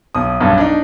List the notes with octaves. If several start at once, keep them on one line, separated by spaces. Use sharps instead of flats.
B1 D#6
B1 G2
D4 D#4